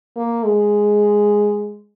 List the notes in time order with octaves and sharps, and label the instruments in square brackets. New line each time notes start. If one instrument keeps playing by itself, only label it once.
[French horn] A#3
G#3